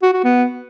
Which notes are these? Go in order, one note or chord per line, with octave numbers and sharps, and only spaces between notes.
F#4
F#4
B3